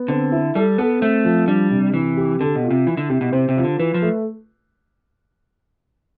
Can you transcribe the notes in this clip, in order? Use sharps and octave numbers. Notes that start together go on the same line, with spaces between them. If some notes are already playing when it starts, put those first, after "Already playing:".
Already playing: B3
D3 C4
E4
G3 A4
B3 A4
A3 C4
F3
G3 D4
C3
C3 E3
G4
D3 A4
B2
F4
C3
E3 E4
D3
C3 G4
B2
C3 C5
C3
E3 F4
D3
E3 B4
F3
A3